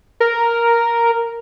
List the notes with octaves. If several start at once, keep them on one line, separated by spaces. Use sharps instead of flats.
A#4